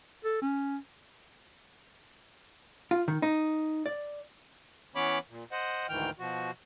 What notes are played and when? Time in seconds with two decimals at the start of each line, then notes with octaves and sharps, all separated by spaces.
0.24 A4
0.42 C#4
2.91 F4
3.08 D#3
3.22 D#4
3.86 D5
4.96 E3 B3 C#4 C#5 B5 D6
5.30 A#2
5.52 C5 D#5 F#5
5.89 D2 G#2 D#3 E3 G5 F6
6.19 B2 F3 F#4